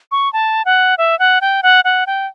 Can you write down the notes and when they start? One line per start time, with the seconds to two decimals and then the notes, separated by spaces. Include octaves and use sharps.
0.12 C#6
0.33 A5
0.65 F#5
0.98 E5
1.19 F#5
1.41 G5
1.63 F#5
1.84 F#5
2.07 G5